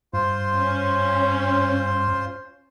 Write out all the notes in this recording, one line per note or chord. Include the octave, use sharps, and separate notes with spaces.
G2 F4 C5
C#4